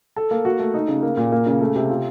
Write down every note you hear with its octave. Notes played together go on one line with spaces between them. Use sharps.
A4
A#3
F#4
A3
D#4
C#3
A#3
A#2
A#3
C#3
A3
C3
F4